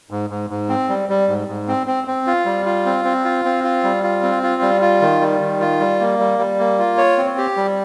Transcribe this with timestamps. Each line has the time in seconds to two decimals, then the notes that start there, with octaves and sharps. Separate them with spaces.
0.11 G#2
0.30 G#2
0.50 G#2
0.69 C4
0.89 G3
1.09 G3
1.28 G#2
1.48 G#2
1.68 C4
1.87 C4
2.07 C4
2.27 F4
2.46 G3
2.66 F4
2.86 C4
3.05 C4
3.25 F4
3.45 C4
3.64 F4
3.84 G3
4.03 F4
4.23 C4
4.43 F4
4.62 G3
4.81 F4
5.02 D#3
5.21 G3
5.40 D#3
5.61 F4
5.80 G3
6.00 A#3
6.19 G3
6.39 G3
6.59 A#3
6.79 F4
6.97 C#5
7.18 C4
7.38 G4
7.57 G3